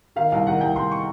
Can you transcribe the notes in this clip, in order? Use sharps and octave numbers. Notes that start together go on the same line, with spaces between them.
D#3 F5
C2 F5
D#3 F#5
C2 G5
C2 C6
C#6